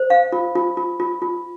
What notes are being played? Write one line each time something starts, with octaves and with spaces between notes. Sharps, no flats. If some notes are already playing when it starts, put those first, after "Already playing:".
Already playing: C5
F5
F4
F4
F4
F4
F4